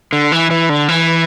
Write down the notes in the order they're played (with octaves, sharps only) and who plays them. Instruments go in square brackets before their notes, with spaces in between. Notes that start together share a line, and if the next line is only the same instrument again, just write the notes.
[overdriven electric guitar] D3
E3
E3
D3
E3